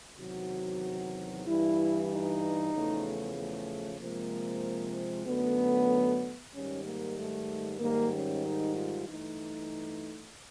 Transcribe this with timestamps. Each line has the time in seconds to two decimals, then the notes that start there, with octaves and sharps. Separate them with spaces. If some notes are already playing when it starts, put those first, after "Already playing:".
0.19 E2 C3 D#3 F#3 F#4
1.45 G2 E3 G3 E4
2.09 D#4
2.73 E2 C#3 F3 A3
3.36 A3
3.99 C3 F3 G#3 A#3
5.26 F#2 D3 F#3 A3 B3
6.53 G#2 D#3 G3 C#4
6.85 A#3
7.17 A3
7.80 G#2 D#3 G3 A#3
8.12 C#4
8.44 D#4
8.76 F4
9.06 G2 E3 A3 D#4